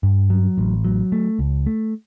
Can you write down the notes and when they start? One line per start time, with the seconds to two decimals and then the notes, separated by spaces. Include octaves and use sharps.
0.03 G2
0.30 F#3
0.58 A1
0.84 F#3
1.12 A3
1.39 C#2
1.66 A3